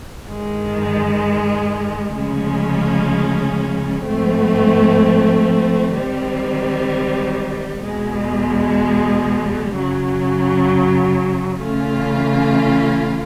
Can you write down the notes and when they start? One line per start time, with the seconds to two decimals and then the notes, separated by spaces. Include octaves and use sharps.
0.23 G2 D#3 G#3
2.13 D2 C#3 F3 G#3 C#4
4.03 G#2 F3 A3 C4
5.93 D#3 G3 C4
7.82 E2 B2 G#3
9.72 F#2 C#3 F#3
11.62 C#3 E3 A3 C#4 F4